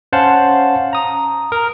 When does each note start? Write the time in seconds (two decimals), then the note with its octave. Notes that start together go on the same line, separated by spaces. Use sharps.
0.13 C#4 C5 F5 F#5 A5
0.93 A#5 D#6
1.52 A#4